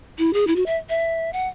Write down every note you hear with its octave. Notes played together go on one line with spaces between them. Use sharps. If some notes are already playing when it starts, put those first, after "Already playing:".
E4
G#4
E4
F#4
E5
E5
F#5